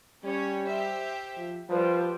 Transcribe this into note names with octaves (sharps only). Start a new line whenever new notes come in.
G3 C#4 C#5
G4 C5 E5
F3
F3 G3 B4 C5